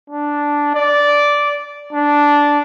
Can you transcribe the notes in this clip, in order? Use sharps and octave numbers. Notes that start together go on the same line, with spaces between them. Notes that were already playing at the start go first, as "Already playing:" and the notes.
D4
D5
D4